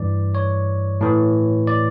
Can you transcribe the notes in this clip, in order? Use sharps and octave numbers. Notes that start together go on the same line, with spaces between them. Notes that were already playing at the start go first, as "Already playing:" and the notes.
Already playing: G2 E3 D5
C#5
A2 E3
D5